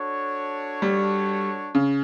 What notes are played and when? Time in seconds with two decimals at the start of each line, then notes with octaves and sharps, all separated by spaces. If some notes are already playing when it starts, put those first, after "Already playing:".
Already playing: D4 F#4 A4 C#5
0.82 G3
1.75 C#3